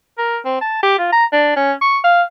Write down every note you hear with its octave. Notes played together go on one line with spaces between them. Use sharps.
A#4
C4
A5
G4
F4
A#5
D4
C#4
C#6
F5